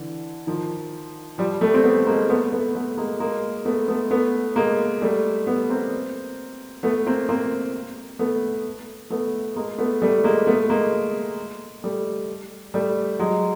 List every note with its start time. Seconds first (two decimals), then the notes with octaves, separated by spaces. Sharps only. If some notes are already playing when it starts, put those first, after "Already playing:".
Already playing: D3 E3
0.47 D#3 F3
1.38 F3 G3
1.61 G3 A3
1.74 C4
1.84 A3 B3
2.07 G#3 A#3
2.29 A3 B3
2.52 A3 B3
2.75 A3 B3
2.97 G#3 A#3
3.20 G#3 A#3
3.65 A3 B3
3.88 A3 B3
4.11 A3 B3
4.56 G#3 A#3
5.02 G3 A3
5.47 A3 B3
5.70 A#3 C4
6.83 A3 B3
7.06 A#3 C4
7.29 A#3 C4
8.19 A3 B3
9.10 A3 B3
9.56 G#3 A#3
9.78 A3 B3
10.02 G3 A3
10.24 G#3 A#3
10.47 A3 B3
10.70 G#3 A#3
11.84 G3 A3
12.74 G3 A3
13.19 F#3 G#3